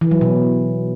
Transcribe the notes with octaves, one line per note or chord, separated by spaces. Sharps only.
E3
F#3
B2